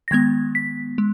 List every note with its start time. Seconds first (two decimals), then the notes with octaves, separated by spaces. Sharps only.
0.08 A#6
0.11 D#3 G#3 B3 G#6
0.55 B6
0.98 G#3